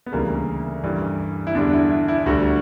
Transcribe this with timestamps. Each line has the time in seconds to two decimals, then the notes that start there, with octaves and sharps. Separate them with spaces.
0.06 B3
0.12 D2 C#3 E3 G3 A#3
0.83 G2 E3 G3
1.47 E4
1.55 E2 D3 G3 D4
1.73 E4
1.91 E4
2.08 E4
2.26 D2 D3 G3 F#4